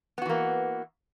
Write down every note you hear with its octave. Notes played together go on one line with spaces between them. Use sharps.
E3 A#3 B3 F#4